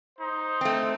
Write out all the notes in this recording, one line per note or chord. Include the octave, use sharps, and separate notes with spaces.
D#4 C5
A3 C4